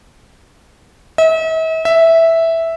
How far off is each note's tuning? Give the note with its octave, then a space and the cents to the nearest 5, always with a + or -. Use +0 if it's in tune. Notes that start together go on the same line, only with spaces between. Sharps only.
E5 -45
E5 -5